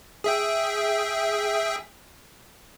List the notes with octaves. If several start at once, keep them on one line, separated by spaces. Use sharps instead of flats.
G#4 E5 G5